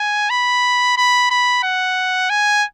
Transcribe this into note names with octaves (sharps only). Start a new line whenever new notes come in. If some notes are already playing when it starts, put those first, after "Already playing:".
Already playing: G#5
B5
B5
B5
F#5
G#5